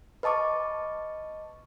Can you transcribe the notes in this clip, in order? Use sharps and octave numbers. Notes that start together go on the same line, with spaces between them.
B4 D#5 A5 C#6 D6